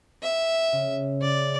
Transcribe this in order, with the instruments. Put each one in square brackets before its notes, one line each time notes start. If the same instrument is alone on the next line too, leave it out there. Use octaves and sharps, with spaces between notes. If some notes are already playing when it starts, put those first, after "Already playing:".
[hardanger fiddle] E5
[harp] C#3
[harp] C#3 [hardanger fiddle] D5